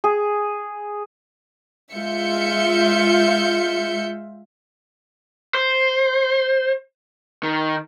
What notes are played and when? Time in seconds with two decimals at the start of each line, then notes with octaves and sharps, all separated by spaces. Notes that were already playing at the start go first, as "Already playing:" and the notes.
0.04 G#4
1.94 G#3 F4 E5 G6 C#7
5.54 C5
7.43 D#3